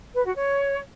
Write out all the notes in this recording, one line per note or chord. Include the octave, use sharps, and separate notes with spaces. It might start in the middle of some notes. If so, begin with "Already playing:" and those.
B4
F#4
C#5